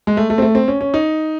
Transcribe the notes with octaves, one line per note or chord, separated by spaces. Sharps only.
G#3
A3
A3
C4
A3
C4
C#4
C#4
D#4